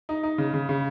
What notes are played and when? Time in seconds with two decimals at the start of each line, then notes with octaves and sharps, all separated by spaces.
0.09 D#4
0.23 D#4
0.38 C#3
0.54 C#3
0.69 C#3